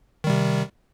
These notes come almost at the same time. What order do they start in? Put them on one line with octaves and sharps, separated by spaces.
D#3 G3 C3